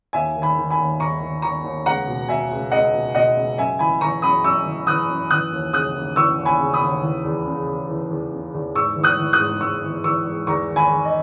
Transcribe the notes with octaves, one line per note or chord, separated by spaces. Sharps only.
D#2 E5 G#5
D#3
G#5 B5
D#3
G#5 B5
D#2
D#2 A#5 C#6
D#3
D#3 A#5 C#6
D#2
C#2 F#5 A#5
B2
B2 E5 G#5
C#2
C#2 D#5 F#5
B2
B2 D#5 F#5
C#2
F#2 E5 G#5
E3 G#5 B5
E3 A#5 C#6
F#2 B5 D#6
F#2 C#6 E6
E3
E3 D#6 F#6
F#2
E3 D#6 F#6
D#2
C#3 D#6 F#6
D#2
E3 C#6 E6
D#2
G#5 B5
C#3
B5 D#6
D#2
E3
E2
C#3
E2
E3
E2
C#3
E2
G#2 C#6 E6
E3
D#6 F#6
E3
D#6 F#6
G#2
G#2 C#6 E6
E3
E3 C#6 E6
G#2
E2 A#5 C#6
D#3
G#5 B5
D#3
D#5